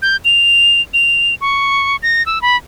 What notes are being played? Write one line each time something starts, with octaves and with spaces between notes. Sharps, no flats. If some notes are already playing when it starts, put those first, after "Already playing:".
G6
F7
F7
C#6
A#6
E6
B5